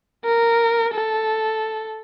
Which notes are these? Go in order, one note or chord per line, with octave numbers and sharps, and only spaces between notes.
A#4
A4